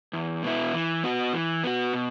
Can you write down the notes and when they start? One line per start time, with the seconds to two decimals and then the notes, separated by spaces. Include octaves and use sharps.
0.13 E2
0.43 B2 B3 E4
0.74 E3
1.04 B3 F#4
1.33 E3
1.64 B3 F#4
1.93 B2